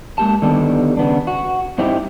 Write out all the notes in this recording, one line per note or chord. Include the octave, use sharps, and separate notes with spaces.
G#3 A#3 G4 A5
D3 D#3 G3 B3
C#3 B3 D4
F#4
G2 C4 D#4 E4 G4